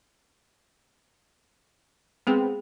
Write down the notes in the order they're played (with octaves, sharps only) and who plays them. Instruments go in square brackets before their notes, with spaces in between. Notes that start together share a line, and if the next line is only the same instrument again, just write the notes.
[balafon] G#3 G#4 G5 [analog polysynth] B3 C4